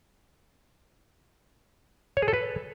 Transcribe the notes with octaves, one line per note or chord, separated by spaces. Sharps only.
C#5
G#4
A4
B4